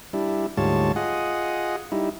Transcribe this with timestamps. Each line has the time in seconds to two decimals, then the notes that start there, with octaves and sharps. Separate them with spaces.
0.13 G3 D4 E4
0.57 D2 G#2 G3 F4 C#5 A5
0.96 F4 G#4 D#5 F#5
1.92 G3 D#4 E4